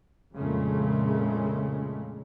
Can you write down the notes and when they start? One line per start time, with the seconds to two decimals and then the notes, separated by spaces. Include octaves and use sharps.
0.36 F2 A#2 C#3 G#3 A3